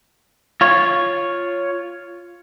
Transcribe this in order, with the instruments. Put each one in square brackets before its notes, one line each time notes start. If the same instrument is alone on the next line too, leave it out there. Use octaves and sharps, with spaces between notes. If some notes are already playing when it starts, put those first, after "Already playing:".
[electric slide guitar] F4 C#5